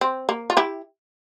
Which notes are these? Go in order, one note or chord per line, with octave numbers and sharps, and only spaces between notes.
C4
A#3
F4
E4 G4